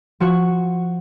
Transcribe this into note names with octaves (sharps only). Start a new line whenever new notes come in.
F3 F#4 C#6